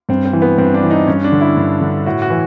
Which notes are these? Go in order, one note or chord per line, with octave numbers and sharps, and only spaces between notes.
G2 C4
C4
E3
B3
G2 C4
D4
E3
D#4
G2 C#4
D4
D3
E4
G2
D3
A2 F#4
F#4
E3